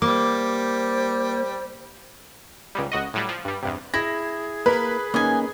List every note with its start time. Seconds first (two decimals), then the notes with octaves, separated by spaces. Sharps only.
0.02 G3 A#3 C5 D6
2.75 C#2 G#2 G3
2.92 C#2 F#4 D#5
3.14 A2 F#3 G3
3.29 F3
3.45 G2 G3
3.63 E2 G2 C3
3.94 E4 G#4 A#6
4.66 A#3 A#4 B4
5.14 A#3 C#4 D#4 D#5 G#5